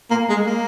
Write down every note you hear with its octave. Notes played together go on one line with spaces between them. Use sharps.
A#3
G#3
A#3